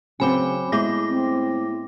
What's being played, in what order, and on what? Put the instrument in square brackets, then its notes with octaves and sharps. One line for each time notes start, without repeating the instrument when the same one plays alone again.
[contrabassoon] C#3 [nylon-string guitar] F#3 C4 [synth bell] G#5 B5 D6
[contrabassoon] A2 [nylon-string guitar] G#3 [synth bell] B3 D6 A#6
[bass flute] C4